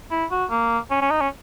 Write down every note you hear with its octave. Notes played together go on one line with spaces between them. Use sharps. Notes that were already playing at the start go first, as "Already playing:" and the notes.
E4
F#4
A#3
C#4
C#4
D#4
C#4